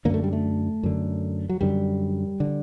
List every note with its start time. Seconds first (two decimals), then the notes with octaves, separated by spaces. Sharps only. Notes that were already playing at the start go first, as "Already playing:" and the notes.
0.05 F#2 D3 A#3
0.14 A3
0.24 G3
0.33 A3
0.83 F#2 D3
1.49 F#3
1.61 F#2 D3 G3
2.40 D3